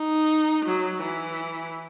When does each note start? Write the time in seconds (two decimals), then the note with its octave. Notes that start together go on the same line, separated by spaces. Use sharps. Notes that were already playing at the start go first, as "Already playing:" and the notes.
Already playing: D#4
0.66 F#3
1.02 E3